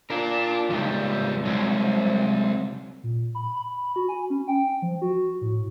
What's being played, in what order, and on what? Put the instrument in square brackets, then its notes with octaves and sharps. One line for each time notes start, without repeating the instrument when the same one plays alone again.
[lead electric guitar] D4 [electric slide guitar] F4 A#4
[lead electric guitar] F2 G3 [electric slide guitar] C#3 G#3 D#4
[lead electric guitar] C2 [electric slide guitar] F#3 G#3 C4
[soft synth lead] A#2
B5
B5
F#4
G#5
C#4
G5
F3
F#4
A2